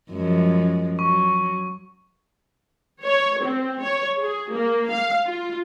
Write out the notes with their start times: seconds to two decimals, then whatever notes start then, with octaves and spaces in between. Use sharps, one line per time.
0.10 F#2 F3 G#3
0.99 F#3 C#6
3.03 C#5
3.43 C4
3.81 C#5
4.19 G#4
4.53 A#3
4.90 F5
5.26 F4